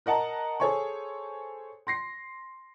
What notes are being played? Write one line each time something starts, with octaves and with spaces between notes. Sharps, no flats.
A#4 D#5 F#5 A5 A#5
G#4 A4 C5 C#5 G#5 C#6
C6 A#6 C7